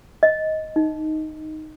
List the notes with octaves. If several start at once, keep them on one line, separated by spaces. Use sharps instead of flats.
D#5
D#4